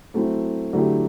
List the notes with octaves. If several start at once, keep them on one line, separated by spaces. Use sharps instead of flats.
F#3 A3 C4 E4
D3 F#3 A3 E4 G4